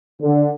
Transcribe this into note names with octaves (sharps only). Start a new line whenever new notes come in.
D3